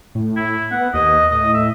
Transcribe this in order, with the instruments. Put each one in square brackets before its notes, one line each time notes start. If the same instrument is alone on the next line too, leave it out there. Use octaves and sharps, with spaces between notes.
[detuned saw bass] A2
[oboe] E4
[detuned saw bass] B3 [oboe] F#5
[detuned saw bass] D#2 [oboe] D#5
[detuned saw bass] A2 [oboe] D#5
[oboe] E5